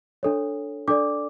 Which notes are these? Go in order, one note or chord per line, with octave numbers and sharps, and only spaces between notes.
D4 A4 C#5
D4 A4 D5 D6